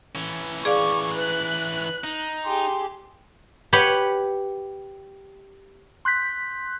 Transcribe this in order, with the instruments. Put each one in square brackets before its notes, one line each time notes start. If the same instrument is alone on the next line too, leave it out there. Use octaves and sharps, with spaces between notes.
[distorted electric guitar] E3 C#4
[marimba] G#4 D5 F5 [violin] C#6 [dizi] D6
[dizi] B4 [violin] F#6
[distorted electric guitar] D#4
[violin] G4 G#4 [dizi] C6
[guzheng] G4 B4 C#5 F#5
[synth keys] C6 F#6 G6 B6